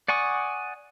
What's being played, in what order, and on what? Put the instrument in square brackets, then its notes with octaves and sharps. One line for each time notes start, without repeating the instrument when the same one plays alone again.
[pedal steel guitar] D5 F#5 G#5 C#6 D#6